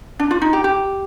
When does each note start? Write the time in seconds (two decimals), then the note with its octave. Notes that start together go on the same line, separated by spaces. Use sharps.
0.19 D4
0.31 F4
0.42 D#4
0.53 G4
0.64 G4